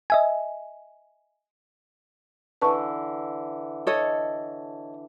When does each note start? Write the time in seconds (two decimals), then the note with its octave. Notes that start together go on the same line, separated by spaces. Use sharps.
0.10 D#5 E5 G#5
2.62 D3 E3 B4 A5 C#6
3.87 A4 C#5 D#5